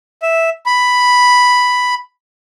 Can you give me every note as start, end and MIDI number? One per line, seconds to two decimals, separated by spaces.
0.22 0.50 76
0.66 1.95 83